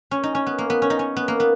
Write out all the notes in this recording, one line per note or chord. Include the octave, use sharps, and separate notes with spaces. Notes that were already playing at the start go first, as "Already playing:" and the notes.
C#4
D#4
C#4
B3
A#3
B3
C#4
D#4
C#4
B3
A#3
B3